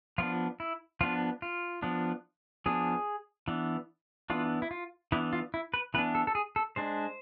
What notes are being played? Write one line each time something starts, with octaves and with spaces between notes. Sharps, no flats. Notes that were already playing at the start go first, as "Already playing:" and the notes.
F3 B3 D4 F4
E4
F3 B3 D4 F4
F4
F3 B3 D4
F3 B3 D4 G#4
E3 B3 D4
E3 B3 D4 F4
E4
F4
E3 B3 D4 E4
F4
E4
B4
E3 B3 D4 B4
A4
A4
G#4
A4
G#3 D4 C5